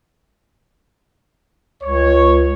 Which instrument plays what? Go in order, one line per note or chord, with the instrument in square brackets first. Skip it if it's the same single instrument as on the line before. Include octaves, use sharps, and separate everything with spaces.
[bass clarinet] C#2 [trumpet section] C#5